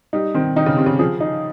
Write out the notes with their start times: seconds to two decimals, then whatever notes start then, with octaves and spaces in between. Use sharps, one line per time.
0.13 G3 D#4
0.34 D#3 C4
0.56 D#3 D#4
0.66 C#3
0.76 C3 C4
0.86 C#3
0.99 F3 G#4
1.20 D#4